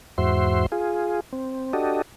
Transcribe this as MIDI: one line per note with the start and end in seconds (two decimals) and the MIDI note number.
0.18 0.66 40
0.18 0.66 44
0.18 0.66 66
0.18 0.66 72
0.18 0.66 76
0.18 0.66 84
0.72 1.20 65
0.72 1.20 68
1.33 1.73 60
1.73 2.02 62
1.73 2.02 66
1.73 2.02 67
1.73 2.02 69
1.73 2.02 75